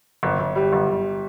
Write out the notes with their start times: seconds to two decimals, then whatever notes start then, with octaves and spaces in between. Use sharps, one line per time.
0.23 G1
0.39 G1
0.55 G3
0.73 G1
0.89 G1